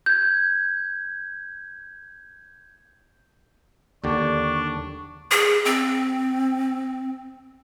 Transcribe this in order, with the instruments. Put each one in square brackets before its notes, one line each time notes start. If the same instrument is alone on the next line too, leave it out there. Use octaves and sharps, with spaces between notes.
[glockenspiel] G6 G#6
[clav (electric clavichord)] D#2 D3 G4 [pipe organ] D4 [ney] C#6
[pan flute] G#4
C4